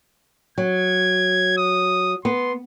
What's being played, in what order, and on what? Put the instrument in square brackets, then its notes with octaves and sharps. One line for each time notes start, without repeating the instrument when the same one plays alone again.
[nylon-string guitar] F#3 [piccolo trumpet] G#6
[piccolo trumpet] D#6
[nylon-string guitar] B3 [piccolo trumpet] C6